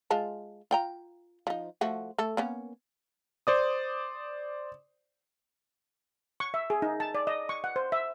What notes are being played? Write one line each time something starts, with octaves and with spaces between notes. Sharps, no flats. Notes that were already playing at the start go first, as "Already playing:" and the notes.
G#3 F4 A5
F4 G5 A#5
F3 D#4
F3 A3 F#4
A3 A4
A#3 B3 C#4
C5 D5 D#6
C#6
E5
G#4
D#4
A5
D5
D#5
C#6
F#5
C5
E5